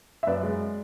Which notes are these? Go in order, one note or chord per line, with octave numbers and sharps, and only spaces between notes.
E5
F#2 B4 D5
G#3